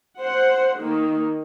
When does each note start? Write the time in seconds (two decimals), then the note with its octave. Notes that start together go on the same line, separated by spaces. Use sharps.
0.19 C5 F#5
0.78 D#3 A#3